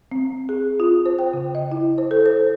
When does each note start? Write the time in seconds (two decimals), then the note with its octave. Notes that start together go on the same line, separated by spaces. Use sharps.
0.12 C4
0.49 G#4
0.80 F4
1.06 C5
1.19 G5
1.33 C#3
1.55 D#5
1.72 E4
1.98 C5
2.11 A4
2.26 C5